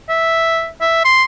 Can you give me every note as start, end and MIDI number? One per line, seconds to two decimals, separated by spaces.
0.09 0.68 76
0.81 1.01 76
1.04 1.23 84